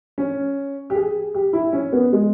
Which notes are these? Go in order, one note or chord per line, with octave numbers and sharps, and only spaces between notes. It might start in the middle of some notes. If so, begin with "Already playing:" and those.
C#4
G4
G#4
G4
E4
C#4
B3
G#3